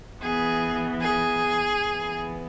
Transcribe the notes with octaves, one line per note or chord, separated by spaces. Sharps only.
E3 B3 G#4
G#4
E3 B3